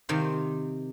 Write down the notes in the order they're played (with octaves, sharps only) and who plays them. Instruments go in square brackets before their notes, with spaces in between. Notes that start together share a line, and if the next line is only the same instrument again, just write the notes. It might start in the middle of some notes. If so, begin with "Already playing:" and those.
[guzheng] C3 D#3 C5